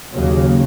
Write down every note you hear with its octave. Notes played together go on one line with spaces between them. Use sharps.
D#2 C#3 F#3 A#3